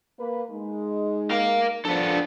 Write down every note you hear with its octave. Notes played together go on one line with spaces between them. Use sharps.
A#3 B4
G#3 D#4
A#4 F5
F3 B3 D4 A4